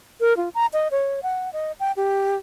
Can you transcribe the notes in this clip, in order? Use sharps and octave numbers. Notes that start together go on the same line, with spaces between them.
A#4
F4
A#5
D#5
C#5
F#5
D#5
G5
G4